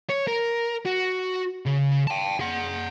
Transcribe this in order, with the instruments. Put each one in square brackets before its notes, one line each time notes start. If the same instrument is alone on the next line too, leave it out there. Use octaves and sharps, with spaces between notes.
[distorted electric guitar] C#5
A#4
F#4
C#3
G5 A5
G#4 F#5